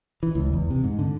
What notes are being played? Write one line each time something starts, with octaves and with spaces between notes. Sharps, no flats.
E3
C#2
E2
C3
G#2
D3